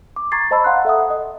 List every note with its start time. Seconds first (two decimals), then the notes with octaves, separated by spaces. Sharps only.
0.16 D6
0.32 A#5 C#6 G#6 A6 C7
0.51 C5 D#5 A5 B5 E6
0.64 F5 F#5 A#5 C6 F#6
0.85 A4 E5 F#5 D#6
1.10 D#5